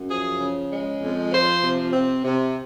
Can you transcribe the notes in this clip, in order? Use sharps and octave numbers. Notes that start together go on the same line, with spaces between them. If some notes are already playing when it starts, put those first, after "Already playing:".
Already playing: F#2
F3 G#4
C#3
G#3
F2
F3 C5
C3
C4
C3